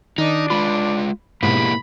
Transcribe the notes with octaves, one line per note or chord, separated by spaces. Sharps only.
D#3 D4 D#4
G#3 F4 B5
G#2 B2 A#3 E4 G4 B5